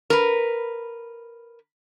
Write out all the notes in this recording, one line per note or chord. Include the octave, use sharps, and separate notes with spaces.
A#4 B4